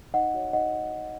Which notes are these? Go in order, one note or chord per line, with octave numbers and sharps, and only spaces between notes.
D#4 D#5 F#5
F#4 C#5
D#4 D#5 F#5